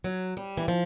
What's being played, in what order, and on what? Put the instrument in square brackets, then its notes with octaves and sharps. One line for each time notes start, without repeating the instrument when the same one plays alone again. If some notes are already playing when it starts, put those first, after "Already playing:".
[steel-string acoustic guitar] F#3
G3
E3
F3